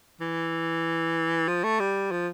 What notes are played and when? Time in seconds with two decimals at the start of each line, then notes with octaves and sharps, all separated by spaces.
0.21 E3
1.48 F3
1.64 A3
1.80 G3
2.11 F3